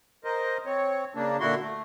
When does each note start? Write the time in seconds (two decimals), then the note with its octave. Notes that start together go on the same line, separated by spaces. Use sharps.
0.24 A#4 C5 D#5
0.66 C4 C#5
1.15 C#3 A#3 D4
1.40 A#2 D3 E4 F#4 C6
1.61 A3